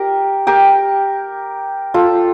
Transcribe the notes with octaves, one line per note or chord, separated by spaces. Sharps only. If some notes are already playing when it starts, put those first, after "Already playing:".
Already playing: G4 A#4
G4 A#4
F4 A4